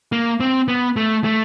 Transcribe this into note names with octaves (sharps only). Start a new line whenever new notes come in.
A#3
C4
B3
A3
A3